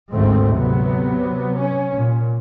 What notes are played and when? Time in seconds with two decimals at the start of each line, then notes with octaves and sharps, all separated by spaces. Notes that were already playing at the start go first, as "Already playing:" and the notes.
0.14 G#1 D2 G#2 A3 C4
0.56 C3 F#3 B3
1.60 C#4
1.96 A#2